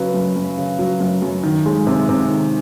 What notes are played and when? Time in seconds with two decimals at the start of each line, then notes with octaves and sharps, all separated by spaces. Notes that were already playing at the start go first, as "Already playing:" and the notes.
Already playing: C#3 F#3 B4
0.14 F#2
0.36 F#2
0.57 C#3
0.79 F#3
1.00 F#2
1.22 F#2
1.43 D#3
1.66 G#3
1.87 C3
2.09 C3
2.30 D#3